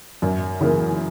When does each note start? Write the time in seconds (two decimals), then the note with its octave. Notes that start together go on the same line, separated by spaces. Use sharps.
0.22 F#2
0.61 C#3 E3 A#3